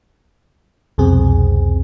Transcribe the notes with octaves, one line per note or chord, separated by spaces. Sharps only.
C2 F2 B2 C4 G#4